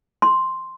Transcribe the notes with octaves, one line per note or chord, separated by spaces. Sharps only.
C6